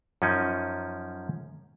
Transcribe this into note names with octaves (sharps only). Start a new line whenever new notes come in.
F#2 F3 C#4 D#4